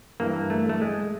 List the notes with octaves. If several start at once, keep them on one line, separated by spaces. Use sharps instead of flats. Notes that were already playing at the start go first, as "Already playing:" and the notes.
G2 E3 A#3
A3
A3
G#3